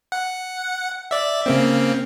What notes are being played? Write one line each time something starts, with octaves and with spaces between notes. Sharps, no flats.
F#5
D5 E5
C#3 A#3 C4